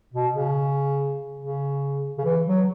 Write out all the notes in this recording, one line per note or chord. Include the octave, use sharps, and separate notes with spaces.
B2
C#3
C#3
C#3
E3
F#3